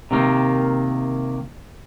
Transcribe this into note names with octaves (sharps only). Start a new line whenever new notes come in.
C3 D#3 A#3